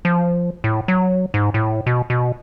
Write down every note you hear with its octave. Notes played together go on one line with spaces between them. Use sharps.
F3
A2
F#3
G#2
A2
B2
B2